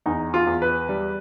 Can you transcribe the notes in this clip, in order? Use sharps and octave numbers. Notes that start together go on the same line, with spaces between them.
E2 D#4
F4
E2
B4
G3